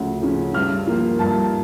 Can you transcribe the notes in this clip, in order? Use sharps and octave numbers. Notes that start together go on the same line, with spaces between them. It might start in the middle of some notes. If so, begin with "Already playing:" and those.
Already playing: D2 C#3 F3 C#4
C#3 F3 C#4
G2 F6
F3 A#3
G2 A5